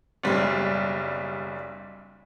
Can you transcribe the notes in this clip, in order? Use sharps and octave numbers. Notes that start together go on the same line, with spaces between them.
F#1 B1 G3